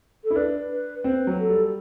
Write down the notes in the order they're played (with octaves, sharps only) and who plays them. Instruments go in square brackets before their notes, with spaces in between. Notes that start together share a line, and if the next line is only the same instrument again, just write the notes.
[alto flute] A4
[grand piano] E4
[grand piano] D4 [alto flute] B4
[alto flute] B4
[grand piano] C4 [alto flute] B4
[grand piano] F#3
[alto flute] A4
[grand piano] G3